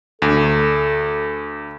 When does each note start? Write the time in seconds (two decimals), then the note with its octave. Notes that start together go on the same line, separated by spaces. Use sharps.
0.22 D2 A4